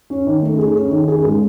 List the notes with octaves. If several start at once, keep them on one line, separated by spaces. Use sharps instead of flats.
C#4
D#3
A3
G#4
C#4
D#3
G#4
G#3